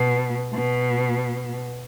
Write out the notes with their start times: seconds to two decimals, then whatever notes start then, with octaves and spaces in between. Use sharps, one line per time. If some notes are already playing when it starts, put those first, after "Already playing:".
Already playing: B2
0.54 B2